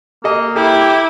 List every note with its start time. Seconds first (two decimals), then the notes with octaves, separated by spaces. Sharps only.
0.24 A#3 A4 D#5
0.56 E4 G4 A4